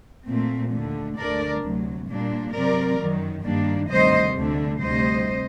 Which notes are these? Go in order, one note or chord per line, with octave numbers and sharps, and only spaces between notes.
A#2 A3 C4
D#2 D3 A3
D2 D3 A3 D4 A#4 D5
D2 C3 F#3
A#2 G3 A#3 D4
C3 F#3 C4 A#4 D5
F#2 D#3 F#3
G2 D#3 G3 A#3 D4
D2 C3 D#3 G3 C5 D#5
D2 D3 A3 D4
D2 C3 G3 C5 D#5